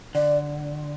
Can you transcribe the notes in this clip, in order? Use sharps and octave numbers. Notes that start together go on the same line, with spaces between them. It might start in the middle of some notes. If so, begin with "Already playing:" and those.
D3 D5